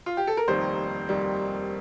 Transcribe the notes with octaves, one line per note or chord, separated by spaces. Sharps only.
F4
G4
A4
A#4
F1 D#2 D#3 G3 C5
F1 D#2 D#3 G3